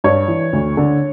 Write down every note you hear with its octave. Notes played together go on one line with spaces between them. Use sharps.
G2 C#5
E3
D2
D3